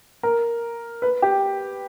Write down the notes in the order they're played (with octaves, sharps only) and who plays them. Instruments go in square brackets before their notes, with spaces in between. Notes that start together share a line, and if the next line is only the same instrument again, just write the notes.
[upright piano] A#4
B4
G4